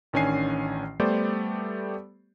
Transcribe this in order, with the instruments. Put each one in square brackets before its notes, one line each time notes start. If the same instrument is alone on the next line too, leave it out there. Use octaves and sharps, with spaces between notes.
[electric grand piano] A1 D#3 C#4 D4 G#5 C7
G3 A3 B3 G4 C5 D5